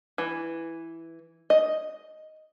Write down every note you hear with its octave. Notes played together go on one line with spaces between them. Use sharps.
E3
D#5